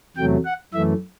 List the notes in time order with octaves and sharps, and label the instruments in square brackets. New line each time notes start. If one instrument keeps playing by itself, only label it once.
[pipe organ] E2 C3 F#3 A3 G5
F#5
F#2 E3 A3 E5